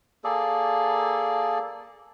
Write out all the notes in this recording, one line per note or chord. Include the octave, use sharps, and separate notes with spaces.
A#3 G#4 A4 D5